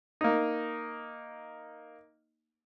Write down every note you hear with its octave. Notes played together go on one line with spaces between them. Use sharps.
A#3 D#4